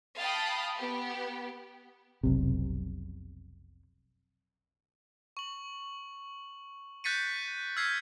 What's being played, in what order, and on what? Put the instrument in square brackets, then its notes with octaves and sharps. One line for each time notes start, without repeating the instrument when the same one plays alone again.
[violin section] F5 G5 A5 B5 D#6
B3 G4
[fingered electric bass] F1 B1 C3
[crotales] C#6 F#7
F#6 G6 A6 B6 C#7 D#7
E6 F6 G6 G#6 B6 C7